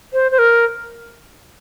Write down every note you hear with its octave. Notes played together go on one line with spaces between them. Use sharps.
C5
C5
A#4